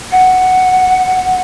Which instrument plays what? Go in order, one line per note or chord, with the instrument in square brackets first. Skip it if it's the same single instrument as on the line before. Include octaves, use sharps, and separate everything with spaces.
[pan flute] F#5